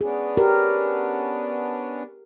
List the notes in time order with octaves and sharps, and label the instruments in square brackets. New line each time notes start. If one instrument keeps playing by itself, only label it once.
[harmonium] B3 C#4 D4 [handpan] G#4
[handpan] G4 A#4